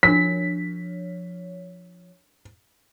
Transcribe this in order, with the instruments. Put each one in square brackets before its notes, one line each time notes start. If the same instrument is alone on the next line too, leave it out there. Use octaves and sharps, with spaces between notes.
[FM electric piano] F3 C#5 [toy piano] D4 F#4 A#4 [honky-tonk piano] B6